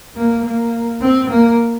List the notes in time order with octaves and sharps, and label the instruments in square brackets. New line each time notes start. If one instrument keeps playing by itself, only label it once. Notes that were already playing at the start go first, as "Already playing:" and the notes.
[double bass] A#3
A#3
C4
A#3